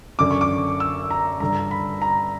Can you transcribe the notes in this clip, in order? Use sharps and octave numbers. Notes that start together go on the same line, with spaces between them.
F#2 D3 D6
C#6
D6
E6
A#5
G2 D3 A#5
B5
A#5